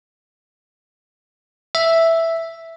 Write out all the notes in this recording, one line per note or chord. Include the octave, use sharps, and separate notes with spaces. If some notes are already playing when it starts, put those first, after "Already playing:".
E5